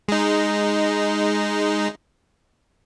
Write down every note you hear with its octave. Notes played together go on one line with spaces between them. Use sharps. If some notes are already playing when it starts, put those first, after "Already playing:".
G#3 D#4